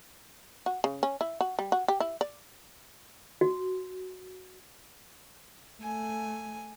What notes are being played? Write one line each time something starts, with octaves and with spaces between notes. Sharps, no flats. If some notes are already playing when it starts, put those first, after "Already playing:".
F#4
C#3
C#4
E4
F#4
G3
F#4
G4
E4
D5
F#4
A3 G#5